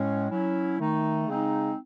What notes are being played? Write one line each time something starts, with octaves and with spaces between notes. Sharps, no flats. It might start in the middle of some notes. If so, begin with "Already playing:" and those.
Already playing: A2 G#3 C#4
F#3 C#4 E4
D#3 A3 D#4
C#3 G#3 C4 D#4